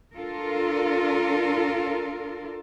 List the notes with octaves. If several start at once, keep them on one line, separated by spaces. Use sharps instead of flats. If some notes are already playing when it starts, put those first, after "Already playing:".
D4 F4 A4 A#4